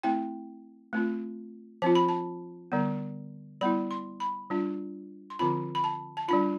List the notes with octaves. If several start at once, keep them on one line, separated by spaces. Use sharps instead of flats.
A3 C4 E4 G5
A3 C4 F4
F3 C4 F4 A5
B5
A5
D3 G3 B3
G3 B3 E4 B5
C6
B5
G3 D4 F4
C6
D3 F3 C4 F4 B5
B5
A5
A5
G3 D4 F4 B5